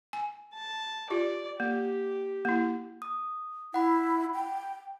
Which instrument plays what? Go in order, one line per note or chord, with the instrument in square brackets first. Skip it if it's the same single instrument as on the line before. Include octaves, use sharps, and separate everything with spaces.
[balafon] G#5
[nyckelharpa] A5
[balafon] F4 G4 [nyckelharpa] D5
[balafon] A#3 [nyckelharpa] G4
[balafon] A#3 E4
[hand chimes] D#6
[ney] E4 [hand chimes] F#5 B5
[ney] G5